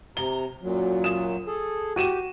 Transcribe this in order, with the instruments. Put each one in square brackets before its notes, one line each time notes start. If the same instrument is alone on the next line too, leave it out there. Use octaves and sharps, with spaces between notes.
[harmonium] C3 A#5 [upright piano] G7
[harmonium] F#2 A#2 F#3
[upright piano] D#6 E7
[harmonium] G#4 A4
[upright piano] F#4 D#7 E7 [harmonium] G4